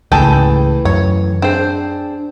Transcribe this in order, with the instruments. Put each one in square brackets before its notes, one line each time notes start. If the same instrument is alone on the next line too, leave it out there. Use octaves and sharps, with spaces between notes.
[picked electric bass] C#2 G#2 C#3 [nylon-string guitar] E3 A3 [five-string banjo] G#4 A4 G5
[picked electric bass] F#2 [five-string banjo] C#5
[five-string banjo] C4 C5 [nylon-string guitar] D4 G#4 G5